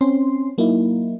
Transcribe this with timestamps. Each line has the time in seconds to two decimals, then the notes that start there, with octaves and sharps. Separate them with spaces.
0.01 C4 C#4 C6
0.58 F#3 A#3 D#4 E4